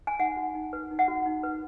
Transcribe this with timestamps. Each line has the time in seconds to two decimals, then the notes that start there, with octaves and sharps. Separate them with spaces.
0.07 G#5
0.19 D#4 F#5
0.37 F#4
0.55 D#4
0.73 B4
0.91 D#4
0.99 F#5
1.08 F#4
1.26 D#4
1.43 B4